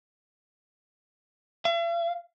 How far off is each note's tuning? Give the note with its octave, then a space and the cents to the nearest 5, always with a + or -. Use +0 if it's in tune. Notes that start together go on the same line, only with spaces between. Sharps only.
E5 +45